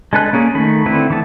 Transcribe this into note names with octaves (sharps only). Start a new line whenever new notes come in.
G#3 D4 A4 B4 F#6
A#3 C#4 G#4
D#3 A3 B5
D3 A3 C4 E4 B4
E3 B3 A5